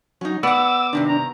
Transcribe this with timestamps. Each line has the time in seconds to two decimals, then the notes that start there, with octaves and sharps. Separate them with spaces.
0.21 F#3 C#4 D#4
0.43 B3 D5 F#5 D6 E6
0.93 G2 C3 D#3 D4
1.08 A#5